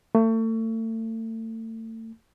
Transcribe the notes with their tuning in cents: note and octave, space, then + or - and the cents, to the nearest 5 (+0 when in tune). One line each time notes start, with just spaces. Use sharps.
A3 +35